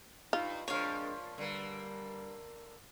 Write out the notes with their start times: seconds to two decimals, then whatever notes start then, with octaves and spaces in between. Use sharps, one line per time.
0.33 G2 D#4 F4
0.68 A#2 F3 G#3 C4 D4 C#5 F5
1.38 G2 D3 G3 A#3